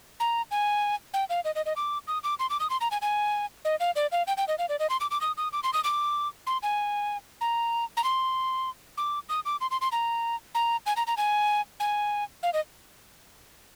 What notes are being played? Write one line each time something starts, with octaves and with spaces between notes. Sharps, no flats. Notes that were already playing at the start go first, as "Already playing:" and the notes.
A#5
G#5
G5
F5
D#5
D#5
D#5
D6
D#6
D6
C6
D6
D#6
C6
A#5
G#5
G#5
D#5
F5
D5
F5
G5
G5
D#5
F5
D5
D#5
C6
D6
D6
D#6
D#6
D6
C6
D#6
D6
C6
G#5
A#5
A#5
C6
D6
D#6
D6
C6
C6
C6
A#5
A#5
G#5
A#5
A#5
G#5
G#5
F5
D#5